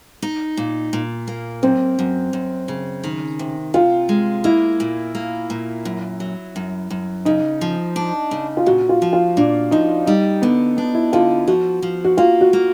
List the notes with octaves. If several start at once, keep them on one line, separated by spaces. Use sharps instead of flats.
D#4
A#2
A#2
A#3
F#2 C4
F#2
F#2
C#3
D#3
C3
C3 F4
G#3
A#3 E4
A#2
A#3
A#2
F#2
F#3
F#2
F#2
C#3 D#4
F3
D4
C#3
F4
A#2 F#4
F4
F3
F4
A#2 D4
F3 D#4
G3 D#4
D3 B3
B3 D4
E4
D3 F4
F3 F#4
F3
F#4
A#3 F4
F#4
A#3